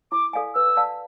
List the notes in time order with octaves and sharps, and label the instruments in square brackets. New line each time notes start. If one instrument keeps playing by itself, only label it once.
[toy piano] E4 [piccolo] D6
[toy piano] A4 D5 F5 G#5
[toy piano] B4 [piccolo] E6
[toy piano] D5 F5 A5